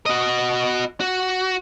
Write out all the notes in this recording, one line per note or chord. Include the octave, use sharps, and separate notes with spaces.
F#4 D#5
F#4